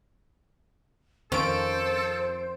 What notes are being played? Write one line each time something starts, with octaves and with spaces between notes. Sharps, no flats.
F2 D#3 F3 C#4 A4 C5 D7